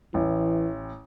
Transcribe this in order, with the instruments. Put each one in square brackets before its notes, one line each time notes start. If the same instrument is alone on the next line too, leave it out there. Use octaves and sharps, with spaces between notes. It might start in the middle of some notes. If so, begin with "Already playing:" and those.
[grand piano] A1 [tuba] E3